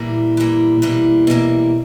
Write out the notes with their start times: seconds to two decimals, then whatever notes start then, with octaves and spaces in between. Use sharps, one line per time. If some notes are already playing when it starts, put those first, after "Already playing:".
Already playing: A#2 E3 G3 A#3
0.37 E3 G3 A#3
0.77 A#2
0.82 B2 E3 G3 A#3
1.27 B2 E3 G3 A#3